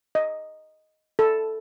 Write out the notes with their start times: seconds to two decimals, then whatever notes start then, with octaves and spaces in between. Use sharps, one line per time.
0.15 D#5
1.19 A4